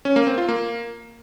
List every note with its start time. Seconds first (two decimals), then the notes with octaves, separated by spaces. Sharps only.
0.05 C#4
0.16 A#3
0.27 C4
0.38 F4
0.49 A#3